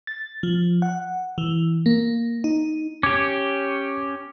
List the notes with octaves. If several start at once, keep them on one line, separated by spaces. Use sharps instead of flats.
A6
F3
F#5
E3
A#3
D#4
C#4 G4 D6 G#6